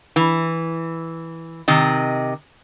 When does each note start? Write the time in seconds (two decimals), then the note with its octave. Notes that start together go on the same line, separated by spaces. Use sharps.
0.16 E3
1.68 C3 D#3 D#5